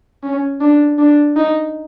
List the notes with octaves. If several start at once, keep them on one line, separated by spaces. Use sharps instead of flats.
C#4
D4
D4
D#4